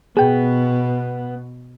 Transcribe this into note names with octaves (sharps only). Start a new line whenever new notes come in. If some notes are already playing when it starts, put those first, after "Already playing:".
B2 B3 G#4 G5